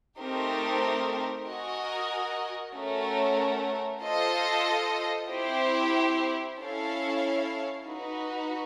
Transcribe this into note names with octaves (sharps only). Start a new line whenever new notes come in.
A3 C4 D#4 G4 A#4
F#4 A#4 D#5 G#5
A3 C#4 F#4 A#4
F4 A4 C5 D#5
C4 E4 G4 C5
C#4 E4 A4 C#5 F5
D#4 F#4 B4